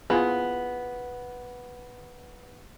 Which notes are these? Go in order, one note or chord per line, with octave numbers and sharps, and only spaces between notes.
B3 E4 F4 G#4